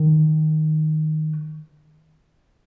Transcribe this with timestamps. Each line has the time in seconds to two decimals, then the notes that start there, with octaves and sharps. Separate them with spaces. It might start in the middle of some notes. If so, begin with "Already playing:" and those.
Already playing: D#3